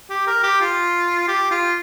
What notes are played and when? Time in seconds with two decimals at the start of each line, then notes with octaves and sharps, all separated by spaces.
0.10 G4
0.27 A#4
0.43 G4
0.61 F4
1.28 G4
1.51 F4